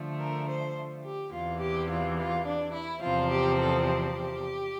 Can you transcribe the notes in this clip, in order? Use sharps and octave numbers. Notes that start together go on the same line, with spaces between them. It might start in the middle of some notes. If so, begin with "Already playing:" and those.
Already playing: D3 F3 A3
A#4
C5
G4
E2 C3 E3 F4
G4
F4
F4
D4
E4
E2 C3 F3 C4 F4
G4
A4
G4